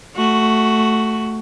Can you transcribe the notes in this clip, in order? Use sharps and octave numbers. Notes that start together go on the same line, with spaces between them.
A3 F#4